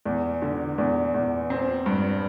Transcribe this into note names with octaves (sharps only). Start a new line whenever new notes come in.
E2
D3
E2
E2
C4
G2